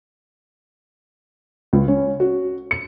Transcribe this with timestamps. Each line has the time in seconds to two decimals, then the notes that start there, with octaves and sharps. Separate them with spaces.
1.73 C#2
1.88 C#4
2.20 F#4
2.71 C#7